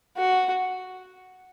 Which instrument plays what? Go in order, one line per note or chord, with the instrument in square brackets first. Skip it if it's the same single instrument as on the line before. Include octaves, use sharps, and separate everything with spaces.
[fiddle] F#4